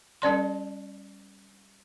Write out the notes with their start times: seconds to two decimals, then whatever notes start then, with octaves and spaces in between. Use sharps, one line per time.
0.22 G3 C#4 D5 C6